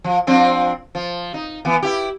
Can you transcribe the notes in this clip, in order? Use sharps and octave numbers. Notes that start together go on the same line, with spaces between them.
F3
F3 C4 D4
F3
D#4
E3 B3
E4 G4